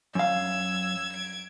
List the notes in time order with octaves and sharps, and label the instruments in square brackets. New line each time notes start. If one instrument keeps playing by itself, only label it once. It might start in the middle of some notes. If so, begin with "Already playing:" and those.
[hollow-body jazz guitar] F#2 F5 [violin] E6 G#6
[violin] G#6 D7